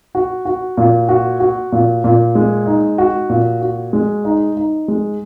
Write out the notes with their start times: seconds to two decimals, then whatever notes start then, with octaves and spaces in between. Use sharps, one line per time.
0.15 F#4
0.45 F#4
0.77 A#2
1.09 F#4
1.40 F#4
1.72 A#2
2.04 A#2
2.35 G#3
2.66 D#4
2.98 F#4
3.30 A#2
3.61 F#4
3.93 G#3
4.25 D#4
4.57 D#4
4.88 G#3